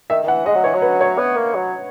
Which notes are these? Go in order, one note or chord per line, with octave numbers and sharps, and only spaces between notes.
D#3 E5
D#3
E3 F#5
G#3 D#5
F#3
E3 C#5
F#3
B4
C#5
B3
A#3
F#3